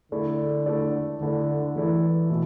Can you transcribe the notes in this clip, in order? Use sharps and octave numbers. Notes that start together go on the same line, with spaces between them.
D3 A3 E4 A4 D5
A3 E4 A4 D5
D3 A3 E4 A4 D5
E3 A3 E4 A4 D5
B2 A3 E4